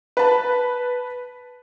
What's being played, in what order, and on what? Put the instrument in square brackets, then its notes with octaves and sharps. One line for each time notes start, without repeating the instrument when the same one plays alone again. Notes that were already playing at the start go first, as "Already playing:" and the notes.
[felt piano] B4 A5